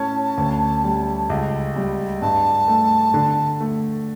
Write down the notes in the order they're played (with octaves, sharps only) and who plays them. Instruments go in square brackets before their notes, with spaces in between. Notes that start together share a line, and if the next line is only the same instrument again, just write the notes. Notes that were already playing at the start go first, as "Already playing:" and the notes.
Already playing: [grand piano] A2 C#4 [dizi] A5
[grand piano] D2
G3
C#2
G3
[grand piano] G2 [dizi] A5
[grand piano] A3
D3
A3